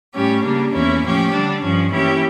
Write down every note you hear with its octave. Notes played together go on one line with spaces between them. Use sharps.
A2 G3 C#4 G4
C#3 G3 A#3 D4
E2 E3 A#3 C#4 E4
A2 F3 C#4 G4
D3 G3 D4
G2 F3 C#4
E3 A#3 C#4 E4 G4